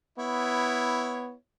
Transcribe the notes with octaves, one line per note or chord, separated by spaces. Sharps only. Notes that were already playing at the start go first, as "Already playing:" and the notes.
B3 E4 C#5